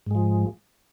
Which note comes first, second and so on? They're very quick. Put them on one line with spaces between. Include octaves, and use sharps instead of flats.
G#2 G#3 F3